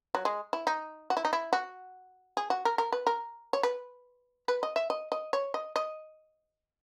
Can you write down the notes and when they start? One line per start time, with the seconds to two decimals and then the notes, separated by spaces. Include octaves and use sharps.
0.15 F#3
0.25 G#3
0.53 E4
0.67 D#4
1.10 F#4
1.17 E4
1.25 D#4
1.33 E4
1.53 F#4
2.37 G#4
2.50 F#4
2.65 A#4
2.78 A#4
2.93 B4
3.07 A#4
3.53 C#5
3.63 B4
4.48 B4
4.63 D#5
4.76 E5
4.90 D#5
5.12 D#5
5.33 C#5
5.54 D#5
5.76 D#5